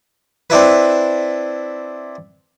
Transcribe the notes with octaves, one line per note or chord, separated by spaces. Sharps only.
C4 D4 E4 B4